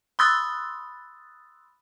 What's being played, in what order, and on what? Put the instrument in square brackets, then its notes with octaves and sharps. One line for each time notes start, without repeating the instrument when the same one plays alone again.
[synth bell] B5 C6 D#6 E6 F#6 A6